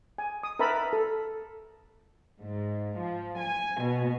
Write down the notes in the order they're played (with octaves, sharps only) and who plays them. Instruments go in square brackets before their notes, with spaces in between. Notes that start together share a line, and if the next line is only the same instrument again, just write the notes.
[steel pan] G#5
D#6
A#4 B4 E5 A5 B5
A4
[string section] G#2
F3
G#5
B2